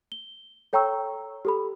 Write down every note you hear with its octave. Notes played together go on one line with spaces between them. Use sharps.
G7
A4 C#5 G5 A#5 C#6 E6
G4 A4 B5